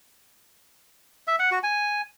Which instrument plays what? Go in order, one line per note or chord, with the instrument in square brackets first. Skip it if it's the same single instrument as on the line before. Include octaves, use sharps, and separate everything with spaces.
[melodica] E5
F#5
F#4
G#5